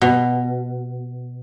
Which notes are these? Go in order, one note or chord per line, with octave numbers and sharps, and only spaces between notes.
B2